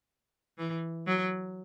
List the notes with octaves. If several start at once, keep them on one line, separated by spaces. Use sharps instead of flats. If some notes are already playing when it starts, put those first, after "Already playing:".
E3
F#3